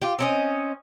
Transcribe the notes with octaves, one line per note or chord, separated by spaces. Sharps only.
F4 G4
C4 C#4 D#5